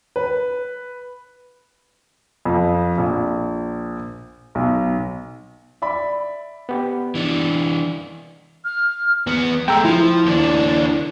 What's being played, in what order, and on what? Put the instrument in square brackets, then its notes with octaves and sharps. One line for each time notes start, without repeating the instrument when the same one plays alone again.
[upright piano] B4
F2
A#1
B1
[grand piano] D5 E5 B5
[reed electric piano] B3 G4
[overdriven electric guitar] E3 D4
[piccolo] F6
[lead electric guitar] E2 B3
[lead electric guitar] G#3 A3 [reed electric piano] G5 A#5 E6
[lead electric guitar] F3 [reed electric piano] E4
[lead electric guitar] D#2 D4